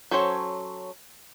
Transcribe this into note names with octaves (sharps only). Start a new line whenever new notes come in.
F#3 C#4 A4 C5 C#5